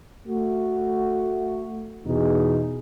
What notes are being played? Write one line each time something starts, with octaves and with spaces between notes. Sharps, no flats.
A3 F#4
E2 B2 D#4 G#4